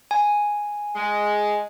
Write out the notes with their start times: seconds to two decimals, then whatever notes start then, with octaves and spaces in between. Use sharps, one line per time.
0.11 G#5
0.96 G#3